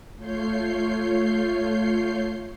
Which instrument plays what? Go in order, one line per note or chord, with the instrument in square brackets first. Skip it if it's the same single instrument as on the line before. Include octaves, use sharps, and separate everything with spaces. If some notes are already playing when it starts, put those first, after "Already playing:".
[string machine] A3 F4 C#5 G6 C7